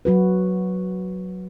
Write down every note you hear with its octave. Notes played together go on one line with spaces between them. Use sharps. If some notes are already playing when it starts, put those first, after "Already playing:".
F#3 F#4 B4